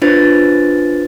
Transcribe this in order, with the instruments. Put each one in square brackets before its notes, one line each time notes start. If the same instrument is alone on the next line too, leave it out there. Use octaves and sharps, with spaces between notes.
[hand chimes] D4 F4 B4 C5 A6